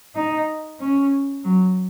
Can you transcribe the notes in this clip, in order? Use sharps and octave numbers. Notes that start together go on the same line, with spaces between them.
D#4
C#4
F#3